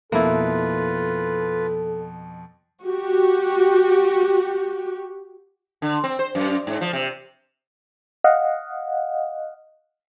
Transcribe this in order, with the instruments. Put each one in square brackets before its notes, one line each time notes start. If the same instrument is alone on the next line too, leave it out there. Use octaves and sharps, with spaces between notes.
[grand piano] F2 B2 [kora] A#3 E4 [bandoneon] F4 B4 [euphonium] A4
[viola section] F#4 G4
[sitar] D3
C4
C5
F#2
G#2
F3
C3
[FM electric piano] D#5 F5 F#5